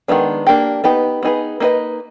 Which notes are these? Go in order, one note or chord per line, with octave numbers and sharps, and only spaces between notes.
D#3 G#3 B3 D4
A#3 D4 G4
B3 D#4 G4 B4
B3 D#4 G#4 B4
A#3 D#4 F#4 B4 D#5